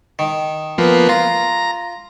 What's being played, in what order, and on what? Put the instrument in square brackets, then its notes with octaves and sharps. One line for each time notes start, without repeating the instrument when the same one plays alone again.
[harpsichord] D#3
[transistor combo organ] F3 A#3 B3
[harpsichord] F4 [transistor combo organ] A#5